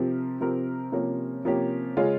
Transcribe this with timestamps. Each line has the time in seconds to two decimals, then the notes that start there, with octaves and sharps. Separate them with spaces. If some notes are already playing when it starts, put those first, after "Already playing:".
Already playing: C3 F3 C4 G4 A#4
0.41 C3 F3 C4 G4 A#4
0.92 C3 F3 A#3 C#4 G4
1.45 C3 F3 A#3 C#4 G4
1.97 C#3 G#3 C#4 F4